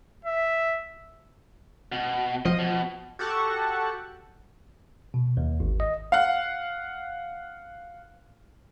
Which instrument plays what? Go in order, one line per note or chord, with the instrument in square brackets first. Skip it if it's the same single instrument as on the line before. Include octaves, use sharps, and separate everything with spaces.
[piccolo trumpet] E5
[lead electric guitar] B2
[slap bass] F3 [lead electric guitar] D#5
[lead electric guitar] B2
[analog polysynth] F#4 G4 A4 F#5 A5 C#6
[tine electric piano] B2
D#2
G#1
D#5
[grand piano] F5 F#5